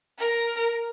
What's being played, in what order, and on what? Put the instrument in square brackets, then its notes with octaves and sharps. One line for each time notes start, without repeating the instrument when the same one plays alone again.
[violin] A#4